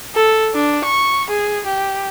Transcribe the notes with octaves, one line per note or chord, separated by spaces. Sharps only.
A4
D4
C#6
G#4
G4